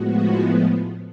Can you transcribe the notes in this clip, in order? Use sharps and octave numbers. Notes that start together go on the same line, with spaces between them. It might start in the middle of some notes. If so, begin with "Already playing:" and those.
Already playing: A2 F3 G#3 B3 F#4